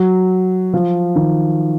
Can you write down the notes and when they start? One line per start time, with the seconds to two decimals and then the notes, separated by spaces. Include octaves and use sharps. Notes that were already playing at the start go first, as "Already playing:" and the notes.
Already playing: F#3
0.73 F3
1.16 D#3